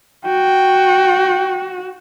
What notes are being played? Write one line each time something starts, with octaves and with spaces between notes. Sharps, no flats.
F#4 G5